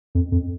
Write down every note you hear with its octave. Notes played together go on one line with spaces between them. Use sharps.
F2
F2